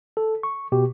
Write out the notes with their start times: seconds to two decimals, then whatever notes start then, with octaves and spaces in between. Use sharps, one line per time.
0.17 A4
0.43 C#6
0.72 B2 G4